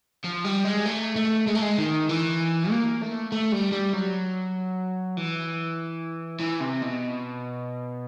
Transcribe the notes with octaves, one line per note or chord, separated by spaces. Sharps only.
F3
G3
G#3
A3
A3
G#3
A3
G#3
D#3
E3
A#3
A3
A3
G3
G3
F#3
E3
E3
C3
B2